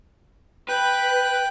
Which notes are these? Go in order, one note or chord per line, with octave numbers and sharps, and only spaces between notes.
B4 G5 F#6